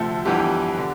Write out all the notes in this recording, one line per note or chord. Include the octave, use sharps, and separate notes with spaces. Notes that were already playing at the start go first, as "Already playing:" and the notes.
Already playing: D2 C3 F3 A3 A4
G1 F2 E3 B3 G4
D3